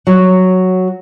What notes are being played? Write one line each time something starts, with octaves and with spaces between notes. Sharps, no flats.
F#3